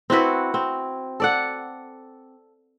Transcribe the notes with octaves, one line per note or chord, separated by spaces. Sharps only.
C4 E4 F#4 B4
C4
A4 D5 F#5